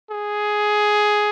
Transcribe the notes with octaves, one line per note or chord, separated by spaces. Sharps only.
G#4